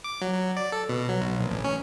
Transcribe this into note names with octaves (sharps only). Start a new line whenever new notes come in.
D6
F#3
F#3
D5
A4
B2
F#3
B1
A#1
A1
C#4